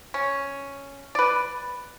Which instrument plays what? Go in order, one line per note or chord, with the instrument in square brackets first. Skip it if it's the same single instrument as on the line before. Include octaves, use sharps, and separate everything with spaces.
[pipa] C#4
B4 D5